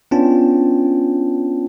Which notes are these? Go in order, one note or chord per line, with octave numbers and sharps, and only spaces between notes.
B3 C#4 D4 F4 G5 A5